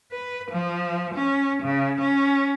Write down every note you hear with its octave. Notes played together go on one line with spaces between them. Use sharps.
B4
F3
C#4
C#3
C#4